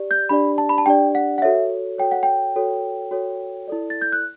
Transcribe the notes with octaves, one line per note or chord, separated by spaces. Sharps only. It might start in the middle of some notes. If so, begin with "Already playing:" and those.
Already playing: G4 D5
G6
D4 G4 D5 B5
A5
B5
A5
D4 G4 D5 G5
F#5
F#5
F#4 A4 C#5 E5
F#4 A4 C#5 G5
F#5
G5
F#4 A4 C#5
F#4 A4 C#5
E4 A4 D5
A6
G6
F#6